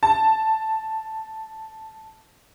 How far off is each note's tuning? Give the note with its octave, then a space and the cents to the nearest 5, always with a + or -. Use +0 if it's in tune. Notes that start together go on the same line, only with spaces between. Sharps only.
A5 +5